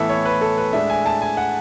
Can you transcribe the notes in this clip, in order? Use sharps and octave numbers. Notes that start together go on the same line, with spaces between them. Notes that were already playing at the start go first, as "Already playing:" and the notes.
Already playing: A2 E3 B3 E4 A4 E5
C#5
B4
A4
B4
A2 G#3 D4 E5
G#5
A5
G#5
F#5